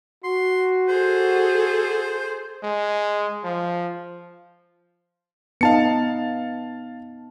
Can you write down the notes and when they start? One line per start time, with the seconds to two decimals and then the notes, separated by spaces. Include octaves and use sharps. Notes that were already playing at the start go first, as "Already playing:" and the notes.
0.24 F#4 C6
0.88 G#4 A4 C5
2.63 G#3
3.44 F3
5.61 B3 D#4 D#5 F5 A5 C#7